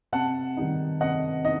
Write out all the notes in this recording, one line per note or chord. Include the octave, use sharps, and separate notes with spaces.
C3 F#5 A5
D#3 G3 D#4
C3 D#5 F#5
D#4 D#5